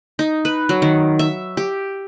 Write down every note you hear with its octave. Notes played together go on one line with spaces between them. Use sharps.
D#4
B4
F#3
D#3
E5
G4